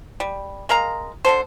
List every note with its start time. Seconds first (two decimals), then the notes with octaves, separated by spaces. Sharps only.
0.20 G3
0.69 G#3 A#4 F5 A#5
1.25 D3 E4 A4 C5